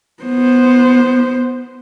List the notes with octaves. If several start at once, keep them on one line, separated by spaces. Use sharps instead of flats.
B3 C5